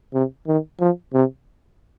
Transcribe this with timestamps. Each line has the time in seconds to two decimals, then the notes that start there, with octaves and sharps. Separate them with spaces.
0.14 C3
0.48 D#3
0.80 F3
1.14 C3